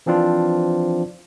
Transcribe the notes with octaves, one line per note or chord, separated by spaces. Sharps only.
E3 F3 C4 D4 F4